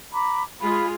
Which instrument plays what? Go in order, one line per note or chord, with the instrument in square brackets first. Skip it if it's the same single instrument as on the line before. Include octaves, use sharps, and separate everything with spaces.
[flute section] A#5 B5 D6
[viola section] G#3 F4 G#4 [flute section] B5